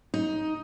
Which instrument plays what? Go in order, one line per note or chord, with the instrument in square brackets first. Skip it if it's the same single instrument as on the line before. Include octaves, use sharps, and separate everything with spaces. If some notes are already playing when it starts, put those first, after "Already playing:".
[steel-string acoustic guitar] D#4